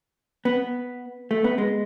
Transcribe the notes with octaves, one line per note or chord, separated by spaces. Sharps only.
B3
A3
B3
G#3